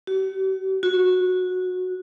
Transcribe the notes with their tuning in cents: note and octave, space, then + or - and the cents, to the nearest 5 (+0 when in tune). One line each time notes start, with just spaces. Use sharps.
F#4 +45
F#4 -15